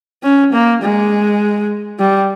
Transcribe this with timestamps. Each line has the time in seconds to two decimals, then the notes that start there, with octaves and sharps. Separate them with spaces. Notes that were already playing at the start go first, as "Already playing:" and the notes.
0.23 C#4
0.53 A#3
0.82 G#3
1.99 G3